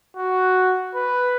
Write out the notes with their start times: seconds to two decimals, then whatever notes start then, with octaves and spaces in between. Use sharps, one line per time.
0.17 F#4
0.95 B4